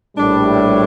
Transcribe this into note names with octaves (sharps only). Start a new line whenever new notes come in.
A#1 A2 G3 D4